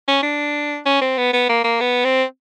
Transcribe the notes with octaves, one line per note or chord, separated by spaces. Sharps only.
C#4
D4
C#4
C4
B3
B3
A#3
A#3
B3
C4